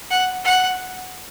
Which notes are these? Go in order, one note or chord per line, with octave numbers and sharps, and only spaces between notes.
F#5
F#5